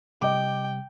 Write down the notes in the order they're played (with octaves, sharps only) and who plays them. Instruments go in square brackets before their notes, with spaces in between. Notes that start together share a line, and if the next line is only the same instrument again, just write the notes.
[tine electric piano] C3 G3 [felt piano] D#5 D6 [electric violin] G5